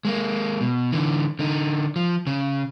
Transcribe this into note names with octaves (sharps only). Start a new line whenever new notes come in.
G#3 A#3
B2
D3 E3
D3 D#4
F3
C#3